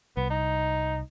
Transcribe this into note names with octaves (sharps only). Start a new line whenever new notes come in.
C2 B3
D#4